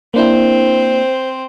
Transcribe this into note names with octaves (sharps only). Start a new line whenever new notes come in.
A#3 C4 D4 E4 C5